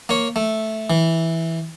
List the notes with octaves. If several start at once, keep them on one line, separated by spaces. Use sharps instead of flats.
A#3 C#5
A3
E3